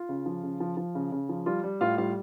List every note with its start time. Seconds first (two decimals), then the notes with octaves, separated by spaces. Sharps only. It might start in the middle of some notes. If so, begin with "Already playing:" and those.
Already playing: F4
0.09 C#3
0.26 F3
0.43 C#3
0.60 F3
0.77 F3
0.95 C#3
1.12 C#3
1.29 F3
1.46 G3 F4
1.64 G3
1.81 A2 F4 F5
1.98 G3 F4 F5